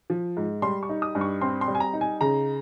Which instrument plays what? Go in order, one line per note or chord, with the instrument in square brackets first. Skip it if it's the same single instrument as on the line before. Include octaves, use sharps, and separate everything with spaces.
[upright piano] F3
G#2
G3 C6
C#6
D#4
D#6
G2
C#6
C4 C6
C6
G3
G#5
A#5
D#4
G#5
C#3 A#5